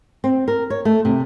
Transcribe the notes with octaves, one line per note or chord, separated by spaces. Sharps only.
C4
A#4
C#5
A3
C3